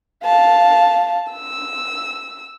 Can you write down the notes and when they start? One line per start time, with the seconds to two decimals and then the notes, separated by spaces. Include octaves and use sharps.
0.24 F5 A5
1.32 E6